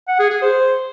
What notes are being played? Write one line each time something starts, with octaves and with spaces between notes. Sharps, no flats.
F#5
G#4
G#4
C5